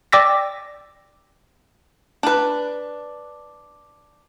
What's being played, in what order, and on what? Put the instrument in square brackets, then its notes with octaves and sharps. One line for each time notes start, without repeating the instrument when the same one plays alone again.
[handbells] D5 G5 D6 E6 A#6 B6
[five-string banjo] D4 B4